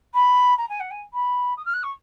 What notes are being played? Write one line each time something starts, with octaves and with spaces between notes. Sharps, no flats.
B5
A#5
G#5
F#5
G#5
B5
D#6
F6
F#6
C#6